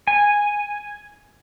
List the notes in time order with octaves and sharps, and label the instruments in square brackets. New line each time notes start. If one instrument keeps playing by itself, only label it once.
[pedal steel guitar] G#5